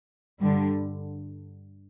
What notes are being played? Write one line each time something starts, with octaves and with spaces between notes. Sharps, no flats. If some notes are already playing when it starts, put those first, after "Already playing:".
G2 D3 G3